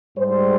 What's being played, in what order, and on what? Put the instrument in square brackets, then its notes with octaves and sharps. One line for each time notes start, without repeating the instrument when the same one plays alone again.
[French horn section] G#2 G3 C5